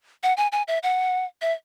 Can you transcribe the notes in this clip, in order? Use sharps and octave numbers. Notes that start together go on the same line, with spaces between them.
F#5
G#5
G#5
E5
F#5
E5